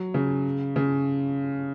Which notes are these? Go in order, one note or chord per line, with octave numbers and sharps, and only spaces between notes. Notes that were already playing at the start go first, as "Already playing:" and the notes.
Already playing: F#3
C#3
C#3